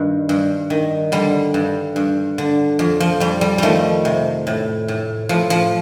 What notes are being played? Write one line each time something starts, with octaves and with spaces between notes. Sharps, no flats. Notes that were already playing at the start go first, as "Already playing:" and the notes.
Already playing: G2 D#3 G3
G2
D#3
D3 G3
G2
G2
D3
F2
F3
F2 G3
G3
D#3 F3 G3 A3
C3
A2
A2
A2 F3
F3